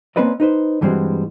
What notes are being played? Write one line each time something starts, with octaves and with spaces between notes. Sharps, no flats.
A#3 C4 C#4 B4 D5 D#5
D#4 B4 C5
G2 E3 G3 G#3 C4 F#4